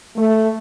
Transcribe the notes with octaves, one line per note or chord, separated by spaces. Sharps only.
A3